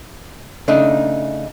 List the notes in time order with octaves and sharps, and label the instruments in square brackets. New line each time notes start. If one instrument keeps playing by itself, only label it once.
[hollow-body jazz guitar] C#3 A3 D4 D#4